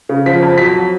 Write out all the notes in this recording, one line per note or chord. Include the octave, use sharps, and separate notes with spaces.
C#3
F3 B6
F2
F#3 B6
F#3